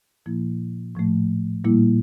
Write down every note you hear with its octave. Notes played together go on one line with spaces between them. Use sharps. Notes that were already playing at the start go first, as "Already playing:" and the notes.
A#2 F3 A#3 E4
A2 F3 A3
A#2 G3 A#3 E4